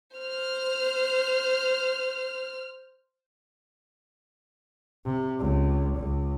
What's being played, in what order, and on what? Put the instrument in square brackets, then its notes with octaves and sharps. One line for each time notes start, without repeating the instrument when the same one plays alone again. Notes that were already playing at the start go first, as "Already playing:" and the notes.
[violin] C5 F6
[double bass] C3
C#2
C#2